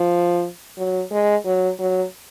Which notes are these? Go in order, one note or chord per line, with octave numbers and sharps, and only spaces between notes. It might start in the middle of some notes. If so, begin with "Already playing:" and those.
Already playing: F3
F#3
G#3
F#3
F#3